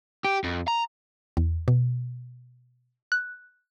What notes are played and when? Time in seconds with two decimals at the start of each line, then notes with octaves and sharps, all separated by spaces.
0.25 G4
0.44 F2
0.68 A#5
1.37 E2
1.68 B2
3.12 F#6